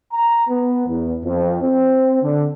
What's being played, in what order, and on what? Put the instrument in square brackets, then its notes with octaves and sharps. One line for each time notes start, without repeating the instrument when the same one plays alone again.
[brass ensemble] A#5
B3
E2
F2
C4
D3